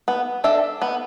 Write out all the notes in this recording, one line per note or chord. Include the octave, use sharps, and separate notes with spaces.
B3
D4 A4 E5
B3